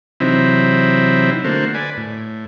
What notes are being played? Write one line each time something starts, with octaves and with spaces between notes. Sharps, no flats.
C3 E3 F#3 C4 D#4 E4
D3 A3 A#3 F#4 C5
B4 D5 G#5
A2